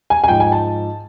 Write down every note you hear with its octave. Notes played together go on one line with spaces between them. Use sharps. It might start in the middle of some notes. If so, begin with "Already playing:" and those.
G#5
G#5
G#2 F3 G5
G#5
A5